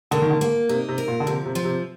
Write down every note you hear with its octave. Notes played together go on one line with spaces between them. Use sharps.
D3 A#3
D#3
D3
A#3
C3 D#4
C3
A#4
A#2
D3
C3 F3
C3
F3
C3